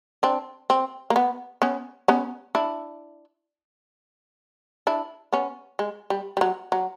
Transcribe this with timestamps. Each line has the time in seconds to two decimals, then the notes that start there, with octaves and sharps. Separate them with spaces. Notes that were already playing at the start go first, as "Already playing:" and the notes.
0.23 C4 D4
0.70 C4
1.10 A#3
1.16 B3
1.62 B3 C#4
2.08 B3 C#4
2.55 D4 E4
4.87 D4 E4
5.32 B3 C#4
5.79 G#3
6.10 G3
6.37 G3
6.41 F#3
6.72 F#3